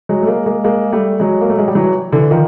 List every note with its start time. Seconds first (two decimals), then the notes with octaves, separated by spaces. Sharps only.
0.09 F#3 G#3
0.22 A3
0.27 G#3 A#3
0.46 G#3 A#3
0.64 G#3 A#3
0.92 G3 A3
1.20 F#3 G#3
1.41 A#3
1.50 A3
1.58 G#3
1.68 G3
1.75 E3 F#3
2.12 D3 E3
2.31 D#3 F3